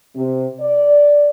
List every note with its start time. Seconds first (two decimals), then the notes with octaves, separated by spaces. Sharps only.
0.15 C3
0.59 D5